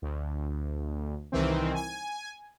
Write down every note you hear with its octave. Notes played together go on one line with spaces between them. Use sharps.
D2
C2 D#3 E3 C4
G#5